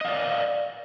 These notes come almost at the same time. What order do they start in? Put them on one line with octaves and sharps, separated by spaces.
D#5 F5 D5